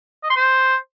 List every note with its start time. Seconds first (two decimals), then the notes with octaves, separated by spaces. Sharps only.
0.23 D#5
0.30 C6
0.36 C5